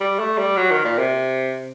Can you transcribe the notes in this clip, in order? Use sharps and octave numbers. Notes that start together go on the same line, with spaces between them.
G3
A3
G3
F#3
D#3
A#2
C3